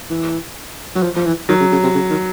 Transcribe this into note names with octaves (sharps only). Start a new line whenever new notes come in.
E3
F#3
F3
F3
E3
D#3 F#3
C#3
C#3
C3
C#3
D#3